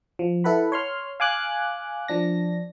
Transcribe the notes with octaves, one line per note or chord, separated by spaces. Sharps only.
F3
E4 A4 B4 F#5 B5
C#5 C6 F6
F5 G#5 D6 F#6
F3 D4 A#6